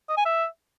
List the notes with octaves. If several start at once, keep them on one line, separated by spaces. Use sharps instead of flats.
D#5
G#5
E5